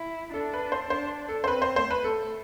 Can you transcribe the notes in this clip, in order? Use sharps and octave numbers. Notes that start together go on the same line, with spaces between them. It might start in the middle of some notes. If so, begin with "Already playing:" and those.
Already playing: E4
D4 A4
B4
C5
D4 C5
A4
C5
C4 B4
C5
A3 C5
B4
A4